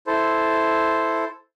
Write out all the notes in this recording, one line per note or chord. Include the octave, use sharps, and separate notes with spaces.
E4 A4 C5